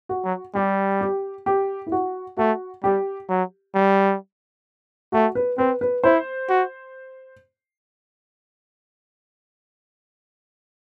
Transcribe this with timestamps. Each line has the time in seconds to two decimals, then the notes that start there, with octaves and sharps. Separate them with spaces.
0.09 F#4
0.24 F#3
0.55 G3 G4
1.01 G4
1.46 G4
1.87 E4
1.92 F#4
2.37 A3 F#4
2.84 G3 G4
3.29 F#3
3.75 G3
5.12 A3 F#4
5.35 B4
5.58 C4 B4
5.81 B4
6.04 E4 C5
6.49 F#4